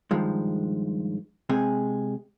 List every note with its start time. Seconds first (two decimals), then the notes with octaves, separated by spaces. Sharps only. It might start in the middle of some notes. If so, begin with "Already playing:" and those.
0.11 G2 D#3 F3 G#3
1.49 C3 G#3 G#4